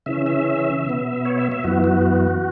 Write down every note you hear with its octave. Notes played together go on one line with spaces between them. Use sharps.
C#3 E3 C#4 E5
E5
B2 B3
C#5
E5
E5
F#2 E3 B3 F#4
F#4